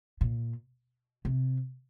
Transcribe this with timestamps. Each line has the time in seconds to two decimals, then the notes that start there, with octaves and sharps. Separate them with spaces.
0.21 A#2
1.25 C3